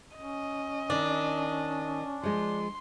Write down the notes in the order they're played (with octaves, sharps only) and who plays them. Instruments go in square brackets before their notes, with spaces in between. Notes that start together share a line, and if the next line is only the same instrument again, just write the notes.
[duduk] C#4 [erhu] D#5
[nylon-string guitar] D#3 [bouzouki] D4
[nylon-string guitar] F3 G#3 [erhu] C6